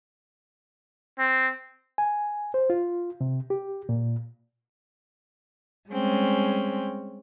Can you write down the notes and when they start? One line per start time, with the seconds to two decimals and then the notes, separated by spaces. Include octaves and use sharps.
1.19 C4
1.98 G#5
2.54 C5
2.70 F4
3.21 C3
3.50 G4
3.89 A#2
5.91 G3 G#3 C4 C#4